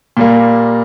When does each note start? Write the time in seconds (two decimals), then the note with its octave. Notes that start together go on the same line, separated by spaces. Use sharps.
0.17 A#2 G3 A#3